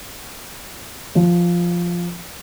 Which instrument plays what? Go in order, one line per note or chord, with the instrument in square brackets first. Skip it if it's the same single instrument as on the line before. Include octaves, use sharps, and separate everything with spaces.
[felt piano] F3